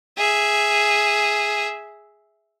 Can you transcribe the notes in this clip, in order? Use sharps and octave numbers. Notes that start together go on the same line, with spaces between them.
G#4 E5